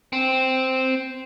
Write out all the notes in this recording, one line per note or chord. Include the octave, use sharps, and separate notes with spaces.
C4